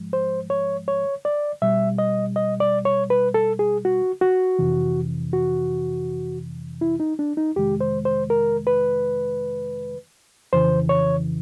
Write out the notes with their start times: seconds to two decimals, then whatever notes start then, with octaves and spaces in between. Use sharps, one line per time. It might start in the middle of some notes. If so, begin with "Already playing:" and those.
Already playing: G#2 F3 G#3
0.13 C5
0.50 C#5
0.88 C#5
1.25 D5
1.62 B2 G3 E5
1.98 D#5
2.36 D#5
2.60 D5
2.85 C#5
3.10 B4
3.34 A4
3.59 G#4
3.85 F#4
4.21 F#4
4.59 F2 C3 E3
5.33 F#4
6.81 E4
7.00 D#4
7.19 D4
7.37 D#4
7.56 F2 C3 D#3 G#3 G4
7.81 C5
8.05 C5
8.30 A#4
8.67 B4
10.53 F2 C#3 E3 C5
10.89 C#5